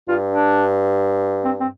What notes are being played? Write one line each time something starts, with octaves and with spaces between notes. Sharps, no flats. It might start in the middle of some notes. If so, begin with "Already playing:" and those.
G2 F4
D4
C4
C4